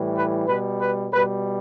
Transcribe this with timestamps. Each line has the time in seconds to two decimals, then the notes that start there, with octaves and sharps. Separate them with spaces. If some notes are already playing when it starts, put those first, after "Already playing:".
Already playing: A2 E3 G3
0.15 B4
0.47 B2 G3 B4
0.80 B4
1.12 B2 G3 B4